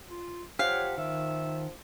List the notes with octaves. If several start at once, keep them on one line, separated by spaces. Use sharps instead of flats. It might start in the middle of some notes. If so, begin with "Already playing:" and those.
F4
F3 G4 C#5 F5 F#5
D#3 F3 E5